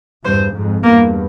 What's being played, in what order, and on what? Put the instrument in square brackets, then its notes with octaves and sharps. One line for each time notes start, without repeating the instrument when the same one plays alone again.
[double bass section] E2 G2 [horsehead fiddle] C5
[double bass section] F2 G#2
[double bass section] E2 G2 [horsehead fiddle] A#3